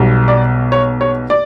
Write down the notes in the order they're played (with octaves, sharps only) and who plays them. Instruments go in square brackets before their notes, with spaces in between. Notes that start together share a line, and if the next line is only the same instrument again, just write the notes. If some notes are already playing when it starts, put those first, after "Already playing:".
Already playing: [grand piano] B1 B2 G3
D5
C#5
C#5
D5